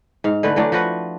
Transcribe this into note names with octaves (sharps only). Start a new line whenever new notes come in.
G#2 F5
D3 E3 A3 B4
E3 F#3 A3 D4
F3 F#4 B4